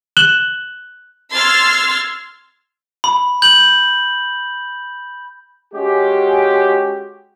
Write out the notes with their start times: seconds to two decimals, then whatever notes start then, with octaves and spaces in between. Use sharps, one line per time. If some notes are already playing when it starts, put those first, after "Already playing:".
0.17 F#6 E7 F#7 G7
1.33 C6 E6 F6 G#6 A6
3.04 B5
3.42 G6 F#7
5.74 G#3 C#4 F#4 G4